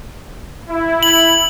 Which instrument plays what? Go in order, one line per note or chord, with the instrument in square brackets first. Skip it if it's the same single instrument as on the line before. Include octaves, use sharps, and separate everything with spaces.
[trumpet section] E4
[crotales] F#7